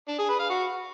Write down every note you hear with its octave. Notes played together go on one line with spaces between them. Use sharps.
D4
G#4
B4
F5
F#4